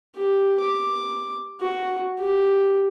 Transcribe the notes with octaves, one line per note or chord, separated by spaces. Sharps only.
G4
D6
F#4
G4